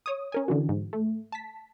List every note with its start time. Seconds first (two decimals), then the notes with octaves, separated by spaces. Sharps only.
0.06 C#5 D#6
0.32 C#4 A#4 G#5
0.48 D3 E3 F#4
0.69 G#2
0.93 A3
1.32 A5 B6